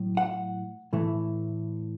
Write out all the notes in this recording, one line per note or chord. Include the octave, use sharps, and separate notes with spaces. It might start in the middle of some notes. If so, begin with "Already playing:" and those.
Already playing: A2 F#3
F#5
A2 E3 A3